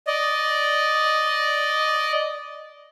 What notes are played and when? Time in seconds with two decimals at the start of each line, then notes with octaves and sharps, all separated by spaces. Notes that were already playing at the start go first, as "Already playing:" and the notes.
0.07 D5 D#5